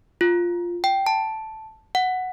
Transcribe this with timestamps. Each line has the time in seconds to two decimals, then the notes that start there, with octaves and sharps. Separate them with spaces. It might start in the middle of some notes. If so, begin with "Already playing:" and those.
0.21 F4
0.84 G5
1.07 A5
1.95 F#5